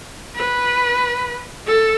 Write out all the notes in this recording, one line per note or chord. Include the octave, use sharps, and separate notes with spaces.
B4
A4